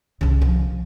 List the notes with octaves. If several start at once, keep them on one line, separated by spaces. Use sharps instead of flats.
C2 C#3
F3